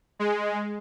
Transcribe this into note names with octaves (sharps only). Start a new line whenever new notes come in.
G#3